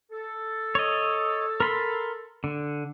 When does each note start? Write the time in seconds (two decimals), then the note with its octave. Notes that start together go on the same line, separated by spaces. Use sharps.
0.11 A4
0.75 C#5 D#5
1.60 A#4 B5 C6
2.44 D3